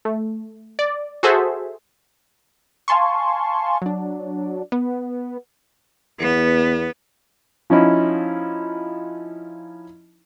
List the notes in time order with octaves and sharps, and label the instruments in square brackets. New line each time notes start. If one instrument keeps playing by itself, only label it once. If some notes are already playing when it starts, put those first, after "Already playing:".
[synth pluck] A3
D5
F#4 G#4 A4 C5 E5
[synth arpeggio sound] F5 G#5 A5 C6 C#6
F#3 D4
B3
[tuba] E2 [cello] B3
[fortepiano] F3 C#4 D#4 E4